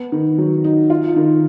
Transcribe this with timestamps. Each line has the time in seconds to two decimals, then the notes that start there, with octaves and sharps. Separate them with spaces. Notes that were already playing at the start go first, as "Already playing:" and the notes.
Already playing: B3
0.12 D#3
0.38 F#3
0.64 D#4
0.90 F4
1.16 D#3